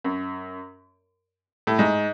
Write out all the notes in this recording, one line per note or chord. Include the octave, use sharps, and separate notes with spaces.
F#2
A2
G#2